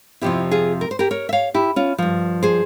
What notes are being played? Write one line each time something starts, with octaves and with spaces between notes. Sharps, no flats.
F2 C3 F3 E4 G4
F4 G#4
A#4
C5
G4 A#4
A#4 C#5
E5
C#5 F5
E4 G4
C#4 F4
G2 F3
G#4 C5